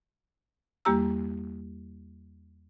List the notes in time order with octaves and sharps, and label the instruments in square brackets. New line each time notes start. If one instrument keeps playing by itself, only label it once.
[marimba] E2 G3 A#3 G4 A#5 E6